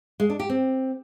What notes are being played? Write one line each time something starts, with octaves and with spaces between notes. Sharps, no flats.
G#3
D4
G4
C4